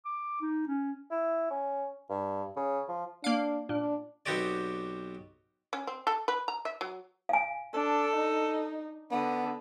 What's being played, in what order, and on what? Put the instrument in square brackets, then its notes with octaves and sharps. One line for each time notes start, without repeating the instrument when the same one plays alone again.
[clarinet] D6
D#4
C#4
[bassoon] E4
C#4
G2
C#3
F3
[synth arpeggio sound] A#3 F5 [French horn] D4
[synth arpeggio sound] A#2 [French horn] D4
[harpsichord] B1 B3 C4 F#4 G4 D5
[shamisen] C#4
C4
A4
B4
A#5
E5
F#3
[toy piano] F5 G#5
[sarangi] D4 [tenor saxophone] A4
[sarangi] D#4
[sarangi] D3 [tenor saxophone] B3